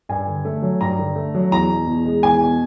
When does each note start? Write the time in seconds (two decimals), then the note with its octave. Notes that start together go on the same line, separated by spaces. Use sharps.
0.09 G2 G#5
0.27 D3
0.45 A3
0.62 F#3
0.81 G2 A#5
0.98 D3
1.16 A3
1.35 F#3
1.51 E2 A#5
1.70 B2
1.87 E2
2.06 G#3
2.23 E2 G#5
2.41 B2